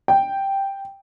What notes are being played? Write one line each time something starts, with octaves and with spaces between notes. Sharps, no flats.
G5